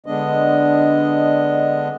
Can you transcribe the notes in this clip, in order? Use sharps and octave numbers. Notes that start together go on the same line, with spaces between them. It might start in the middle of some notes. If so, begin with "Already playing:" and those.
D3 G#3 B3 D4 D#5